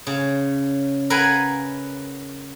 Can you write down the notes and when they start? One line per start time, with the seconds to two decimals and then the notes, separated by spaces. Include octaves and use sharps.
0.07 C#3
1.10 A#4 B4 F5 F#5 G#5 B5